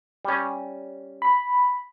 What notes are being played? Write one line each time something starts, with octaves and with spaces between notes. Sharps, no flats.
G3 C#4
B5